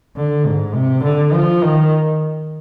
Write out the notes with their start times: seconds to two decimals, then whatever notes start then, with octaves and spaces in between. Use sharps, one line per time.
0.16 D3
0.46 G#2
0.74 C3
1.04 D3
1.34 F3
1.63 D#3